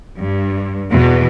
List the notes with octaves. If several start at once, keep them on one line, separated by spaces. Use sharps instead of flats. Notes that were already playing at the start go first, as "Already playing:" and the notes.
G2
E2 B2